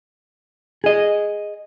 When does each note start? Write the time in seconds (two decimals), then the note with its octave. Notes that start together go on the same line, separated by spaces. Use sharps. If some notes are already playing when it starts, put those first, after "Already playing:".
0.84 G#4 D#5